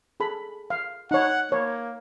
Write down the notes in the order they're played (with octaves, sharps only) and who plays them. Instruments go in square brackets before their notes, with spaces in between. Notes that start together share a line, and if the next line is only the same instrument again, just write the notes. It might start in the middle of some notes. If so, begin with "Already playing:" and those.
[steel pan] G#4 A4 B5
F5
[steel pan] D#4 C#5 [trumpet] F#5
[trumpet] A#3 [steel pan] C#5